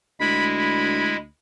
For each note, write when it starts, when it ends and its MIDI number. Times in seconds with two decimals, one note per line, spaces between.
0.20 1.28 38
0.20 1.17 56
0.20 1.17 64
0.20 0.46 83
0.59 1.16 83